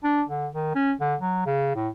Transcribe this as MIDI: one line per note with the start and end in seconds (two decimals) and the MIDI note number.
0.04 0.22 62
0.29 0.47 50
0.54 0.72 51
0.75 0.92 61
1.00 1.15 50
1.20 1.41 54
1.46 1.71 49
1.75 1.88 45